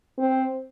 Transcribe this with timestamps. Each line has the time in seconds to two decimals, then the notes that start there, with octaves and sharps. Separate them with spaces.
0.18 C4